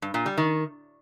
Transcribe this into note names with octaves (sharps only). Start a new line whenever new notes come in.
G2
A#2
G3
D#3